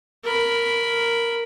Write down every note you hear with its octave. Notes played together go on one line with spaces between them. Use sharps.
A#4 B5